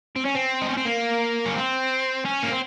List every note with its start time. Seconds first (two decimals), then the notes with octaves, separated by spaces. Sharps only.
0.16 C4
0.25 C#4
0.35 C4
0.62 D#4
0.69 C#4
0.77 C4
0.86 A#3
1.46 C#4
1.55 C4
2.25 C#4
2.43 A#3
2.52 C4